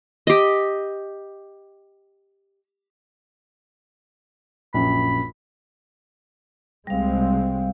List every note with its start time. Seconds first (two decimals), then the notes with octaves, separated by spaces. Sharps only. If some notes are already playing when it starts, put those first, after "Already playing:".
0.27 G4 D#5
4.74 A#1 F#2 B5
6.87 C2 G3 G#3 C4 F5